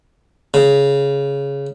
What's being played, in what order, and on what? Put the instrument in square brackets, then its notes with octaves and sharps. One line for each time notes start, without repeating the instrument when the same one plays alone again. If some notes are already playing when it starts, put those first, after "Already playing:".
[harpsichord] C#3